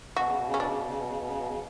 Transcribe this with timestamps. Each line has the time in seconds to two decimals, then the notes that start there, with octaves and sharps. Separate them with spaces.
0.16 B2 F#4
0.27 C#3
0.37 B2
0.47 C#3
0.54 C#4
0.58 B2 D4
0.68 C#3
0.77 B2
0.89 C#3
0.99 B2
1.08 C#3
1.18 B2
1.28 C#3
1.38 B2
1.49 C#3